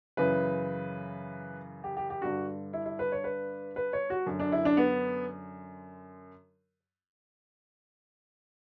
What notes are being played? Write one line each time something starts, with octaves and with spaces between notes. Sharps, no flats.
F#2 C#3 E3 B4
G4
G4
G4
G2 D3 F#4
E4
E4
B4
C#5
B4
B4
C#5
F#4
F#2 D3
D4
E4
D4
B3